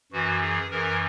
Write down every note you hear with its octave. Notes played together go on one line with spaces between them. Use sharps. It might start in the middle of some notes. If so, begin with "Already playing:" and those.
F#2 E3 F#4
G#4
F#2 E3 A#4